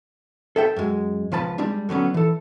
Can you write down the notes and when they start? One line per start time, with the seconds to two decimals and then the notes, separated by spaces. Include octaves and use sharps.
0.56 A4 E5 G5
0.76 F#2 G#3
1.32 C#2 F3 B4 A5
1.58 G3 G#3 D4
1.89 D3 F#3 B3 C#4
2.14 E3 A4